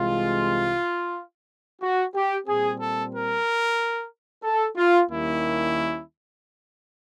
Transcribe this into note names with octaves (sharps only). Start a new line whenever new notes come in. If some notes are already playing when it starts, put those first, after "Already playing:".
Already playing: C2 C3 E3 G#3 F4
F#4
G4
A#2 G3 C4 G#4
A4
A#4
A4
F4
D#2 D#3 G3 A#3 C#4 E4